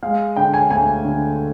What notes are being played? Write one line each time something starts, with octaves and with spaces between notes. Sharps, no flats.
G#3 F5
D3 G5
G#5
D2 G#5
D3